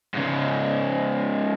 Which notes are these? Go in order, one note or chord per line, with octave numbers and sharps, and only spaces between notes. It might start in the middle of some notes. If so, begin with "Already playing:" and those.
G#2 C#3